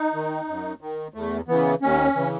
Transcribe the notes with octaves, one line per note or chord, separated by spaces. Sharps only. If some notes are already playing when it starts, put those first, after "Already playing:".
Already playing: D#4
D#3
F#2
D#3
E2 A3
C#3 E3 B3
D#2 C#4
C#3 E3